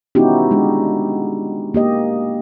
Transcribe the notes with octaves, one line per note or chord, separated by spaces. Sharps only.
B3 C#4 D#4 E4 F#4 G4
G#3 D4
A#3 G4 D#5